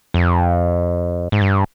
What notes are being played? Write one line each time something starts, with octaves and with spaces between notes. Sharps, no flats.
F2
G#2
G2